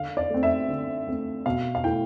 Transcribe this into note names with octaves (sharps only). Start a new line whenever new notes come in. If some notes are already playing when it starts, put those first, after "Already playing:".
Already playing: D3 F5
D5
A3 C4
E5
D3
A3 C4
B2 F5
F5
A3 E4 G5